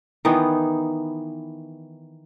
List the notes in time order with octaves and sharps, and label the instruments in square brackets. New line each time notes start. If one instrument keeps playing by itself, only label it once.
[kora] D#3 E3 B3 D#4